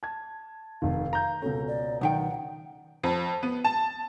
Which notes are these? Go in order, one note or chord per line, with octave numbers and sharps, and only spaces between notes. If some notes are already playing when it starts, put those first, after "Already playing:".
A5 G#6
F1 D#3 F5
A#5 G6
C#2 B2 C#4 A4
D5
B1 D#3 F#5 G5
F2
B3
A5